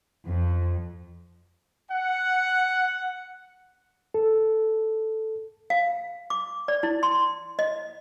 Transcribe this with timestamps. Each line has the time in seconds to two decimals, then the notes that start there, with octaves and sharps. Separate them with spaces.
0.24 F2
1.89 F#5
4.14 A4
5.70 F5
6.30 D6
6.68 D5
6.83 E4
7.03 C6
7.59 D#5